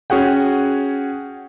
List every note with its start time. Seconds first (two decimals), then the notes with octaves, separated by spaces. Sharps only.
0.10 C#4 F#4 G#4 F#5 G5